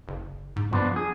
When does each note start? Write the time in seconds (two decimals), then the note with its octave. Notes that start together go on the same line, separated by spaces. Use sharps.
0.08 F#1
0.56 G#2
0.72 G2 F3 B3 D4
0.96 G#4